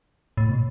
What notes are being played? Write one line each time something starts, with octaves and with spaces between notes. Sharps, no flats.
A2
B2